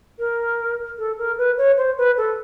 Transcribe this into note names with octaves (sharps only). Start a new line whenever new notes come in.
A#4
A4
A#4
B4
C#5
C5
B4
A4